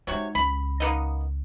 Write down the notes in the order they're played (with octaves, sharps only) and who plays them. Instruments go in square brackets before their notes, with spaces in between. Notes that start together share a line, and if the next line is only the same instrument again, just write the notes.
[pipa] C3 F#4 C#5 [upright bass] G#3 D#4
[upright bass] C#2 [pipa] B5
[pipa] A#3 B3 D#4